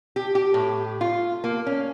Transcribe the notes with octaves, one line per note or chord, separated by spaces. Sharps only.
G4
G4
A2
F4
A#3
C#4